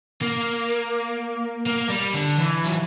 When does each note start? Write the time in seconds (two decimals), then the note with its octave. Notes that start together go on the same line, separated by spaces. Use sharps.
0.21 A#3
1.66 A#3
1.90 G3
2.14 D3
2.38 E3
2.64 F#3